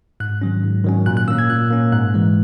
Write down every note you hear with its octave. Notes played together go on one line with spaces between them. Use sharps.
G#2 F#6
D#3 F#3 C#4
G#2
D#3 F#3 C#4
A#2 F#6
F#6
A#3 C#4 E6
G#6
A#2 F#6
A#3 C#4
G#2 F#6
E3 G#3